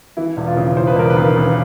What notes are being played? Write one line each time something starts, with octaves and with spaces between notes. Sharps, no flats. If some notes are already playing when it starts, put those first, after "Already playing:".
E3 E4
E1
F4
C#3
E3 C5
B4
E1 A#4
B4
D#2
C#3